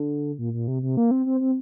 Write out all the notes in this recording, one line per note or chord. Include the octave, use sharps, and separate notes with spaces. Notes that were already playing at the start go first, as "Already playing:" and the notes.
Already playing: D3
A#2
A#2
C3
C3
A#3
C4
C4
C4